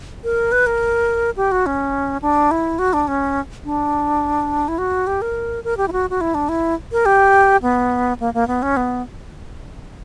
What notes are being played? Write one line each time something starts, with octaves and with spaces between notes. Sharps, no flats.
A#4
B4
A#4
G4
F#4
C#4
D4
E4
F#4
D4
C#4
D4
E4
F#4
G4
A#4
A#4
G4
E4
F#4
F#4
E4
D4
E4
A#4
G4
B3
A#3
A#3
B3
C#4
B3